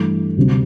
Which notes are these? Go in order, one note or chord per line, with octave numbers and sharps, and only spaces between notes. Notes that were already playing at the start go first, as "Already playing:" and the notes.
Already playing: G2 E3 A3
D2 C3 G3 C4